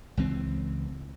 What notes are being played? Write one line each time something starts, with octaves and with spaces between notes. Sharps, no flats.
C#2 E3 C4